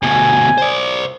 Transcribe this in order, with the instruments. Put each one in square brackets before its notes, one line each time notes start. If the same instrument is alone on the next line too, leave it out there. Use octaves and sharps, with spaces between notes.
[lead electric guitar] D2 B2 [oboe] G#5
[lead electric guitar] C5 D5